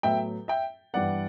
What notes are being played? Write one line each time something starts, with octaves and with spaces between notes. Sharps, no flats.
A2 F#3 B3 E5 G5
E5 G5
G2 E3 G3 B3 D5 F#5